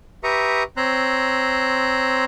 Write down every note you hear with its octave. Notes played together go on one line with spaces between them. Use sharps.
G4 B4 E5 A#5 C#6 D#6
C4 C#5 A#5 C6 E6 F#6